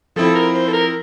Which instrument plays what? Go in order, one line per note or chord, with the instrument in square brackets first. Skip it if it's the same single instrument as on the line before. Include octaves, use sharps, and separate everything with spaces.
[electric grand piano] F3 C4 E4 [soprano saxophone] A4
[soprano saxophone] A#4
C5
A4
A#4